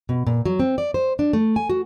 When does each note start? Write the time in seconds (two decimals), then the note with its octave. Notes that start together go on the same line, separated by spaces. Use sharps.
0.09 B2
0.27 A#2
0.46 F#3
0.60 C4
0.78 D5
0.94 C5
1.19 D4
1.33 A3
1.56 G#5
1.69 F#4